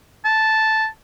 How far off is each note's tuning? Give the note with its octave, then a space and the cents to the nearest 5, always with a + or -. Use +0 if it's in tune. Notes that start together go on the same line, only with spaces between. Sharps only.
A5 -5